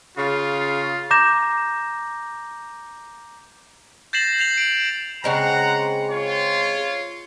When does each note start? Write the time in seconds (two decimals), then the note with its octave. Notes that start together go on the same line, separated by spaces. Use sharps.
0.17 C#3 F4
1.11 A#5 D6 G6 A#6 E7
4.13 G6 A6 A#6 C7 E7 F#7
4.39 G6 C7 F7 F#7
4.57 D7
5.24 C#3 G#3 C4 F#5 A#5
6.10 F4 C#5